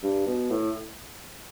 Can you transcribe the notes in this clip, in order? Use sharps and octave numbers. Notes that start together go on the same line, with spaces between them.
G2
B2
A2